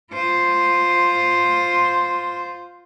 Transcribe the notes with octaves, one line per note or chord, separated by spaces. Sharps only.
F4 C5